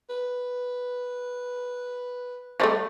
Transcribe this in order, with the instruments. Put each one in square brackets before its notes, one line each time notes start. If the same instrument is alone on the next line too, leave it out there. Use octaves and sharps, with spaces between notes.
[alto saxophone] B4
[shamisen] F3 G3 A3